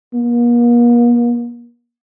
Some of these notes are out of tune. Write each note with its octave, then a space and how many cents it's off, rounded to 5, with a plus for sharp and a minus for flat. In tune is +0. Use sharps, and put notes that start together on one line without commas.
A#3 +40